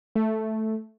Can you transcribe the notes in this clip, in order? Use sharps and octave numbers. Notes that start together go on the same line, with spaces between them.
A3